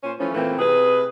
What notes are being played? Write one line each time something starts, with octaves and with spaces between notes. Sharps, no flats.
A#2 C#4 C5
E3 F3 A3 C#4
A#2 E3 A3 A#3 C4
C3 G#4 B4